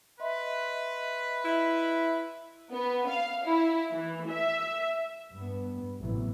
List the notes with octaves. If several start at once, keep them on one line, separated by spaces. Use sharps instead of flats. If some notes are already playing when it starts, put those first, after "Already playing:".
B4 D#5 E5 C6
E4
B3
F5
E4
E3
E5
G2 B3
A1 G#2 C3 E3 F#3 B3